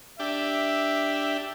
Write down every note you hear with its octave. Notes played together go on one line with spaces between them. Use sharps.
D4 G4 E5